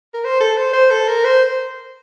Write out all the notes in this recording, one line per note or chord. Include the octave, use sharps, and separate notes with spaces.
A#4
C5
A4
C5
C5
A4
A#4
C5